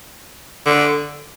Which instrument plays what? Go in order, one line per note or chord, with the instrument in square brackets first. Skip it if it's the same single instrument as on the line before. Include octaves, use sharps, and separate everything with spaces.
[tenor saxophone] D3